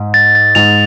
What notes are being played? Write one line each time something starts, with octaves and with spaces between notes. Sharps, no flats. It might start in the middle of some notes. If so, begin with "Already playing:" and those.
Already playing: G#2
A6
A6
G#2 F7